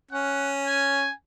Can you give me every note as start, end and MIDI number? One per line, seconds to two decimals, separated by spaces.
0.11 1.09 61
0.11 0.50 78
0.66 1.13 80